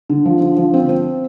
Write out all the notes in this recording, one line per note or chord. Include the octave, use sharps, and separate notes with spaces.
D3
F3
D3
F3
C4
C4